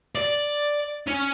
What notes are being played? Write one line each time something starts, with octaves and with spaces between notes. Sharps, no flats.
D5
C#4